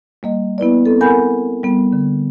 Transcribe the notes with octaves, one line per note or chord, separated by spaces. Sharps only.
G3 A#3 D#5
B3 E4 B4 D5
C4 A4
A#4 F#5 G#5 B5 G6
G3 B3
D3